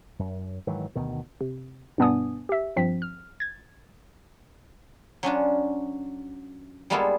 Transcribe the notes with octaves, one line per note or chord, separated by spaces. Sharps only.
F#2
G#2 D#3 E3 F#3
D2 B2 D#3
C3
G2 B2 B3 D4 G#5 D#6
G4 E5
G2 F3 C4 B6
F6
G#6 A6
F#3 C#4 D4 F4
G3 G#3 A#3 B3 F4 A4